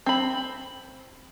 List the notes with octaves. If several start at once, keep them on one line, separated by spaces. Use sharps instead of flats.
C4 B5